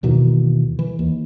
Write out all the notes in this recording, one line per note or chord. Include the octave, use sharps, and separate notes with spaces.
D#2 B2 D#3 E3
E3
D#2